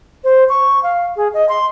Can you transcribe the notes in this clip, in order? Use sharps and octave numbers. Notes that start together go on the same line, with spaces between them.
C5
C#6
F5
G#4
D#5
C6